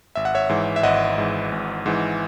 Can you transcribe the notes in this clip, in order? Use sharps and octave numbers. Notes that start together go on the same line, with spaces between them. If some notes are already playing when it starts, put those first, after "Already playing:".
G#1 E5
F#5
C#5 E5
G#2 E3
E5
G#1 D#5 F#5
G#2 E3
G#1
G#2 E3